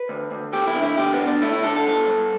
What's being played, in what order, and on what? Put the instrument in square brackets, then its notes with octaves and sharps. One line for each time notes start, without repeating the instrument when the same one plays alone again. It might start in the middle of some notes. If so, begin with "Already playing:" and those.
Already playing: [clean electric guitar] B4
D2
D2
A3 G4
E4
D3
E4
D2 G4
B3
D2
D4
A3 E4
E4
D3 A4
A4
G2
G2